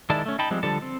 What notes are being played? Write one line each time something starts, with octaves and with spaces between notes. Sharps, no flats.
D#3 G#3 E4 D5 A5
A3 C#4
D#4 G5 A5 B5
F3 G3 G#3 C4
D3 F3 G3 A4 A5
C4